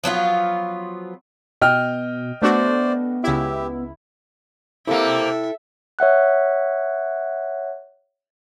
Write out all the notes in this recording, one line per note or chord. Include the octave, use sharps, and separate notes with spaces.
F3 F#3 B3 F4
B2 D#5 G5 F6
A3 B3 D4 F#4 C5 D5
C#2 E4 G4 E5
C3 A#3 E4 A4 E5 G5
C#5 E5 F#5 F#6